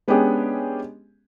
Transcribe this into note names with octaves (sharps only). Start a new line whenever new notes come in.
G#3 B3 C#4 D4 G4 G#4